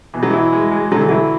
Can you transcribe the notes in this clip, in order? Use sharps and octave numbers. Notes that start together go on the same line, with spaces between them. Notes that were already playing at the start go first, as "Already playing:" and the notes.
B2 E3
F#3
E3 E4
G#3
G#3
D3 F#3
E3
F#3 E4